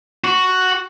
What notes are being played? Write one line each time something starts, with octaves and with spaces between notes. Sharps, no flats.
F#4